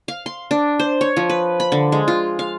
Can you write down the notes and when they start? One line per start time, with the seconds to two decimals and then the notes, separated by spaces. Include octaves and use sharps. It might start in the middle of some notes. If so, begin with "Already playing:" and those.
0.08 F5
0.26 C6
0.51 D4
0.79 C5
1.01 C#5
1.17 F3
1.30 B4
1.60 B5
1.72 D3
1.92 G#3
2.08 F4
2.39 F5